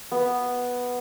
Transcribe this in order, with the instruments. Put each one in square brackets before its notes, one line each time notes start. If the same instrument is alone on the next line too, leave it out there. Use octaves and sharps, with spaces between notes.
[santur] B3